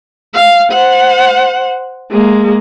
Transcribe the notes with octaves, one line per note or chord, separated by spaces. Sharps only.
F5
C5 F#5
G#3 A#3